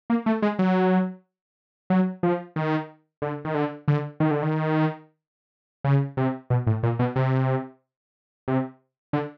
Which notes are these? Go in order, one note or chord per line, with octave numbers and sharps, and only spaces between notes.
A#3
A3
G#3
F#3
F#3
F3
D#3
D3
D#3
D3
D3
D#3
D3
D#3
C#3
C3
B2
A2
A#2
B2
C3
C3
D3